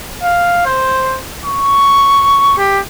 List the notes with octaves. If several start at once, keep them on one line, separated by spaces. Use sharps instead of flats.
F5
C5
C#6
G4